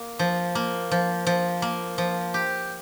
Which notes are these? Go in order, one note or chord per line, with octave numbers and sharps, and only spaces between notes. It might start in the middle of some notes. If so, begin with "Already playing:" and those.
Already playing: A#3
F3
A#3
F3
F3
A#3
F3
G4